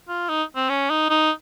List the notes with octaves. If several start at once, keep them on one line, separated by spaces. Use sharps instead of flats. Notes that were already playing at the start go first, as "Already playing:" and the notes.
F4
D#4
C4
C#4
D#4
D#4